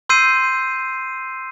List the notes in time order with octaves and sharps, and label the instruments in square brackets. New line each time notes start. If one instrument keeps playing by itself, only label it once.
[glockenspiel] C6 E6 G6 C7 D#7